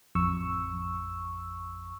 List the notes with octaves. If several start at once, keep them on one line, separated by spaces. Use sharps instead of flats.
A1 F2 C#6 E6